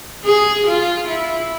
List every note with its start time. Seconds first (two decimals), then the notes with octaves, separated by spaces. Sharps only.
0.25 G#4
0.68 F4
1.09 E4